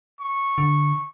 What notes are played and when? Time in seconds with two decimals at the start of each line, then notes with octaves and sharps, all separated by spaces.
0.20 C#6
0.58 D3